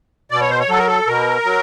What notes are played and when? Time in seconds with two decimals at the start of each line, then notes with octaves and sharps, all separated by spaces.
0.31 B2 D5
0.41 C#5
0.50 C5
0.60 C#5
0.69 F#3 A4
0.78 A#4
0.88 A4
1.07 B2 A#4
1.45 F#3